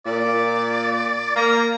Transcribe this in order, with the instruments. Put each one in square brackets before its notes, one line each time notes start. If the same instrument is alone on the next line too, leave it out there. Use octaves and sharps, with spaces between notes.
[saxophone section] A#2 [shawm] D5
[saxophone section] A#3 [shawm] A#5